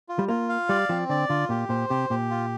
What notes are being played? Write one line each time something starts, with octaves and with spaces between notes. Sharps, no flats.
F4
G3
A#3 F4
F5
G3 D5
F3 C4
D3 D5
D3 F4
A#2 G4
A#2 C5
C3 G4
A#2 G4
F4